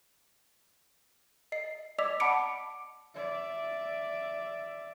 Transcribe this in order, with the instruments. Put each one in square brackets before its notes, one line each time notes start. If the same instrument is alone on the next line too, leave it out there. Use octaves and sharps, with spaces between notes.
[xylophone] D#5 C7
D5 D#5 D6 E6 B6 F7
F#5 A5 B5 D6 C#7 D7
[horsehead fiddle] D5 E5